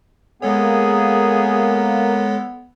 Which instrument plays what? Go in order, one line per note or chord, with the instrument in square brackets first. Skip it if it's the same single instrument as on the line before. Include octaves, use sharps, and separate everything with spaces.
[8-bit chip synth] G#3 A4 C#5 [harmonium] A#3 [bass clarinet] B3 [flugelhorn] G#4